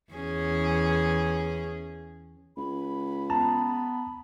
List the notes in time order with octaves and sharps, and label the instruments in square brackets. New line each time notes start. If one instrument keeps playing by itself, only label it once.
[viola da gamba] E2 C#4 G#4
[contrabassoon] C#2 [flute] B5
[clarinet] B3 [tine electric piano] A5 A#5